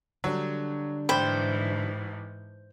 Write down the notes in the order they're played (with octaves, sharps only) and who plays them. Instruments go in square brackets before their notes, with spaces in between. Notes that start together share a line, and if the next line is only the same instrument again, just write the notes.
[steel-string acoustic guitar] D3 G3 D4 [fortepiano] F#3
[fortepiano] A1 G5 B5 [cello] G#2 E3 [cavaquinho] C5